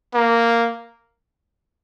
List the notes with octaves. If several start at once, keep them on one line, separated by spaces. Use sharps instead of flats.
A#3